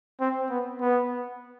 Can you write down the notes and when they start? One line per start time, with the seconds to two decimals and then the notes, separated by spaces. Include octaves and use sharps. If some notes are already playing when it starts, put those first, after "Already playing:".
0.20 C4
0.50 B3
0.80 B3